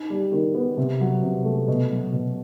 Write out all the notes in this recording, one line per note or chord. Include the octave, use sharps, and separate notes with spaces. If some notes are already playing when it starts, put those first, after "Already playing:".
Already playing: D#4
G3
D#3
B3
C3
F#3
C3
A3
B2
F#3
B2